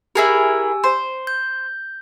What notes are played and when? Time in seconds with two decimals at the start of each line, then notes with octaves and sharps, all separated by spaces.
0.15 E4 G4 G#4 A#4 G#5 E6
0.84 C5
1.27 G6